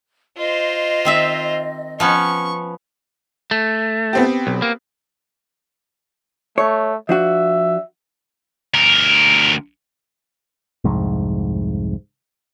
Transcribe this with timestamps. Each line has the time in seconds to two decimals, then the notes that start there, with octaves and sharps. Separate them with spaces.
0.37 F4 C5 D#5
1.05 D#3 C4 E5
2.00 F3 B3 C#4 C#6
3.51 A3
4.13 B3 C4 G4
4.47 B1
4.62 A#3
6.58 A3 C#5
7.09 F3 D4 F#4 E5
8.74 D2 A#4
10.84 C2 F2 G#2